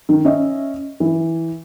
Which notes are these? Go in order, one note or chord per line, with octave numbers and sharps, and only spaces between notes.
D#3
C#4 D#5 E5
E3